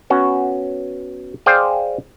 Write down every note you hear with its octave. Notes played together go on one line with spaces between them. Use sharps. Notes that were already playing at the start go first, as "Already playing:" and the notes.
B3 C#4 F#4
G#4 C5 D5 F5 G5